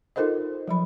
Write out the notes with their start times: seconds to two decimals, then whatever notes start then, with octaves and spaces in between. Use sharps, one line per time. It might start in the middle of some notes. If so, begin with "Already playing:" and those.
0.16 D#4 F4 A4 A#4 C5 D#5
0.68 F3 F#3 B5